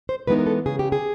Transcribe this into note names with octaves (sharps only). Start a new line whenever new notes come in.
C5
E3 G#3 B3 D#4 B4
A#4
A4
C#3 G#4
G4
G#4